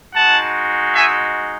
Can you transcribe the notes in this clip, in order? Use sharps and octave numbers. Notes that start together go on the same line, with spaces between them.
G#3 D#4 F#4 F#5 A5
E5 G#5